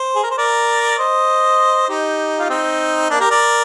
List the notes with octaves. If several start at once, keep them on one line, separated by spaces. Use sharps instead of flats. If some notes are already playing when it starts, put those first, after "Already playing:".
Already playing: C5
G#4
A#4
C5
A#4 D5
C5 D#5
D#4 G4
F4
C4 D#4
A#3 D4
G4 A#4
A#4 D5